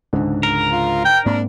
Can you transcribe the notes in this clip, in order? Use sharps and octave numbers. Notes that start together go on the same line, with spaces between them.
C#2 G#2 D3
A#4
F4
G5
G#2 A#3 C4 D4